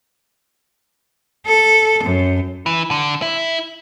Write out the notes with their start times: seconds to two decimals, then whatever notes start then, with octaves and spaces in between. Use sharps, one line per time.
1.46 A4
2.03 F#2
2.66 E3
2.91 D3
3.22 E4